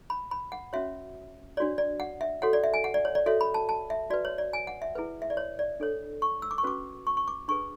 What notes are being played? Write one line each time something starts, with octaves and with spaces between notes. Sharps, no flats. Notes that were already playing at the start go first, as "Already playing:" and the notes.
B5
B5
F#5
C#4 F#4 C#5 E5
D4 F#4 C#5 D5
D5
F#5
E5
F#4 A4 C#5 F#5
D5
E5
G#5
F#5
D5
C#5
D5
F#4 A4 C#5 E5
B5
A5
A5
E5
F#4 B4 D5
C#5
D5
G#5
F#5
E5
E4 G#4 B4
E5
D5
C#5
D5
D4 A4 C#5
C#6
E6
D6
C#6
C#4 F#4 B4 D6
C#6
C#6
D6
D4 G#4 B4 C#6